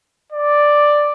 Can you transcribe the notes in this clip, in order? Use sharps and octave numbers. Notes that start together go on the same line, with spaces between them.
D5